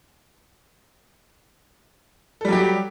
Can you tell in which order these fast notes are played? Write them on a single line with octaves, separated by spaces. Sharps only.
A4 G3 F#3 G4